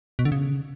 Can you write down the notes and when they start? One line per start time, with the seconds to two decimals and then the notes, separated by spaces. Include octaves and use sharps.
0.19 B2
0.25 D3
0.32 C#3